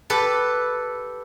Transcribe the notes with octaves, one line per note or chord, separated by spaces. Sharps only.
G4 A4 B4